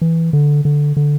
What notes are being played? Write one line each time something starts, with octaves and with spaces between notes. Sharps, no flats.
E3
D3
D3
D3